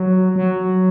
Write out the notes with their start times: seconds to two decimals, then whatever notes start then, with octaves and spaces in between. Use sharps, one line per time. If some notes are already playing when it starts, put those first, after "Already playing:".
Already playing: F#3
0.36 F#3